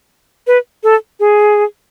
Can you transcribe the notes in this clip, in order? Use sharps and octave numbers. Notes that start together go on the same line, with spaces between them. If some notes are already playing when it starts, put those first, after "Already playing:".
B4
A4
G#4